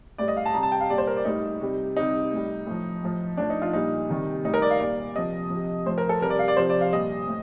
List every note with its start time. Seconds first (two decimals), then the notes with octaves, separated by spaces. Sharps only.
0.18 A2 G3 D5
0.28 D#5
0.37 F5
0.46 A5
0.54 C3 G3 A#5
0.63 A5
0.72 G5
0.81 F5
0.89 A#2 G3 D5
0.98 C5
1.07 A#4
1.17 D5
1.25 A2 G3 D#4
1.61 C3 G3
1.96 C3 G3 D#4
2.32 A2 G3
2.67 A2 F3
3.03 A2 F3
3.37 A2 F3 D4
3.50 D#4
3.62 F4
3.73 A#2 G3 D#4
4.09 C3 D#3 G3
4.45 A2 G3 D#4
4.54 A#4
4.62 D5
4.71 F5
4.80 A#2 G3 D5
5.15 C3 F3 D#5
5.50 C3 F3
5.86 A2 F3 C5
5.98 A#4
6.09 A4
6.21 C3 G3 A#4
6.30 D5
6.39 F5
6.48 D5
6.57 C3 F3 C5
6.70 D5
6.81 F5
6.93 A#2 G3 D#5
7.28 A2